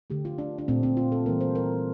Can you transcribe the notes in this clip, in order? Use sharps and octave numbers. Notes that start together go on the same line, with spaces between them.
D3 A3 G4
F4
D4
D4
A#2 A3 C4
C4
F4
A4
E3 G3 A#3 A#4
C5
A#4